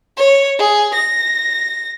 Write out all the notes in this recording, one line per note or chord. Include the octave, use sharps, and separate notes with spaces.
C#5
G#4
A#6